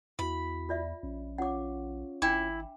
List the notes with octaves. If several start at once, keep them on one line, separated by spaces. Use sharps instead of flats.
E2 E4 F#4 B5
F4 D5 E5
A#1 C#4
C#4 F4 C#5 F#5 D6
G#1 D4 E4 G5 D6